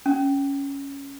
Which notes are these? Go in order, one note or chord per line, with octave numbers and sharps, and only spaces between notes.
C#4